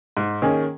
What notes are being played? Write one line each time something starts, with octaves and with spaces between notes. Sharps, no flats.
G#2
D#3 A#3 C#4 G#4